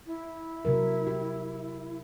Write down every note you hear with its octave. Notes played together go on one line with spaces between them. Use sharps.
E4
C3 F#3 A#4
G4